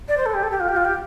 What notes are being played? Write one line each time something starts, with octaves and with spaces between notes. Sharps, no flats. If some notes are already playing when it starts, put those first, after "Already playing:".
D5
C5
A4
G4
A4
G4
F4
G4
F4
G4